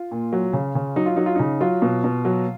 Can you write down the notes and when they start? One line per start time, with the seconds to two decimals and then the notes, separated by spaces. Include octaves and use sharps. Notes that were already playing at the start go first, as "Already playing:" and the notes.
Already playing: F4
0.11 A#2
0.33 F#3
0.53 C#3
0.75 C#3
0.96 F#3 D#4
1.06 F4
1.16 F#3 D#4
1.26 F4
1.35 C#3 D#4
1.61 F#3 F4
1.82 B2
2.04 B2
2.25 F#3